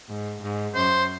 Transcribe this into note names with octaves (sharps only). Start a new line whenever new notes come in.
G#2
G#2
F#2 C5